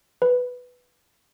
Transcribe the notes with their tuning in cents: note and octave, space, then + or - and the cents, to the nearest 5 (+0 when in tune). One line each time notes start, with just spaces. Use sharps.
B4 +5